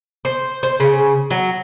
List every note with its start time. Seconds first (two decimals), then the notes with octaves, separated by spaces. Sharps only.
0.25 C5
0.63 C5
0.80 C#3
1.30 F#3